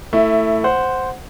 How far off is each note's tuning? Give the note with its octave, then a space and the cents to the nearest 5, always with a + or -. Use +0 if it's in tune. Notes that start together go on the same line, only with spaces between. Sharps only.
A3 +15 E4 +0
C5 -5 F#5 +0